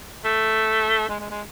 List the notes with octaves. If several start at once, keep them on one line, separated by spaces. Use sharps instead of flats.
A3
G#3
G#3
G#3